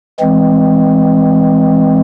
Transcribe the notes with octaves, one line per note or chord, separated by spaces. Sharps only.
E3 G#3 C4